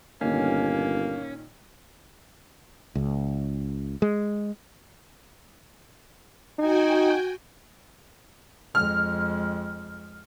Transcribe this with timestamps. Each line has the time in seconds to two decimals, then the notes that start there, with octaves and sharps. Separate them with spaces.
0.21 G1 A#2 D#3 A#3 C#4
2.95 C#2
4.02 G#3
6.59 D#4 F#4 G5 G#5
8.75 F2 G#3 F6